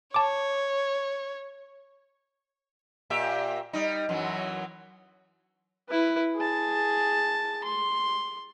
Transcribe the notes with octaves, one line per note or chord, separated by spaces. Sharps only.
C#5 A5 D6
A#2 G4 E5
G3 D#4
F#2 E3 F#3
E4 B4
G#4 A5
C6